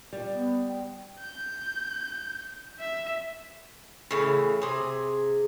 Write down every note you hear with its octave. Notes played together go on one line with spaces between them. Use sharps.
G3
B3
G5
G6
E5
A2 C#3 E3
C3 G#4